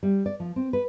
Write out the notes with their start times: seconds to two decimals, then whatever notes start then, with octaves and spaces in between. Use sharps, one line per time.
0.03 G3
0.26 D5
0.40 F3
0.56 C4
0.73 B4